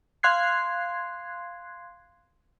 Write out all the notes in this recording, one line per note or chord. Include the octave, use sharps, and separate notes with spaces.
F5 C6 F#6 G#6 C7